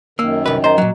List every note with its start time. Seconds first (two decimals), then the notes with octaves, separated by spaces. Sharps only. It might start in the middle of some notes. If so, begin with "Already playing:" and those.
0.19 F#2 D#3 A#3 E6
0.46 C2 B4
0.64 C5 D#5 A#5
0.78 A#2 F#3